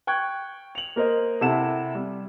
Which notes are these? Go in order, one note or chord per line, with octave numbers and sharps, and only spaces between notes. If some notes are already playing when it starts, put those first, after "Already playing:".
G5 C#6 F#6 G#6
F7 F#7
A#3 A#4 C5 D#5
C3 E4 A4 F#5 E7
G3